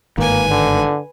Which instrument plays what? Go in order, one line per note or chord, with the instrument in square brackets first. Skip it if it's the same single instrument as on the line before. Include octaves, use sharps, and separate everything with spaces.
[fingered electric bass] G1 G#2 D#3 [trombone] A#3 [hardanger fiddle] B4 G#5
[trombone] D3